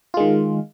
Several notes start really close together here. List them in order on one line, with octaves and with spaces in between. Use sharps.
F4 G#3 D#3